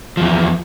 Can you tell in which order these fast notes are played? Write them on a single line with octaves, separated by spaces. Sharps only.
F3 E2 E3